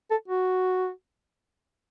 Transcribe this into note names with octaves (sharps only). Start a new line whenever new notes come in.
A4
F#4